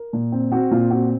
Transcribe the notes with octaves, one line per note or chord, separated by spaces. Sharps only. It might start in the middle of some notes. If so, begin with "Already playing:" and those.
Already playing: A#4
A#2
C4
C4 F#4
A#2 F4
C4 F#4